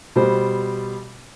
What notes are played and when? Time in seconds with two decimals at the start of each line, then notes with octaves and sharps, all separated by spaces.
0.16 B2 G3 C5